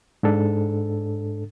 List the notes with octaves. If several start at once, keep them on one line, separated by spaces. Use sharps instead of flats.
G#2 D4 A4